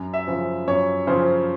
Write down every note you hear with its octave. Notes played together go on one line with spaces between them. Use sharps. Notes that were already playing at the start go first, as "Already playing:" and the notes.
Already playing: F#2
E5
C#3 F3
F#2 C#5
C#3 F3 C5